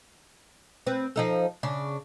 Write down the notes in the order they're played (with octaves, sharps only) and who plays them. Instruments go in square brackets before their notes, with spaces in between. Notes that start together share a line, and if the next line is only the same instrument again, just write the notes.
[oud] C4 B4
F3 D#4 A4
C#3 D4